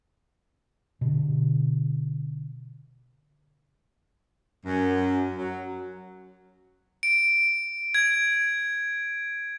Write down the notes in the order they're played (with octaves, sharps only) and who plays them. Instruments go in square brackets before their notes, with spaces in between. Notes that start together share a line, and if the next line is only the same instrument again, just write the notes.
[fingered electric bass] B2 D3
[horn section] F#2
F#3
[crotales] D7
G#6